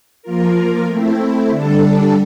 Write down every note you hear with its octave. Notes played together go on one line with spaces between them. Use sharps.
F3 A#3 F4 A#4
A3 C4 E4
D3 G3 D4 A4